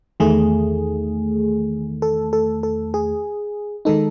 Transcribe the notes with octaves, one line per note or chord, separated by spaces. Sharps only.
E2 D#3 A3 G#4
A4
A4
A4
G#4
D#3 G#3 D#4 A4